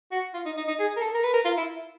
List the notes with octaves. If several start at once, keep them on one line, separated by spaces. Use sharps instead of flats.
F#4
F4
D#4
D#4
D#4
G#4
A#4
A4
A#4
B4
A#4
F4
E4